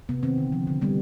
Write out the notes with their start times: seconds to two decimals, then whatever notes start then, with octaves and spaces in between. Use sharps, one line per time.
0.09 C3 B3
0.23 D#3 C4
0.38 D3
0.52 F3
0.67 D3
0.81 G3 B3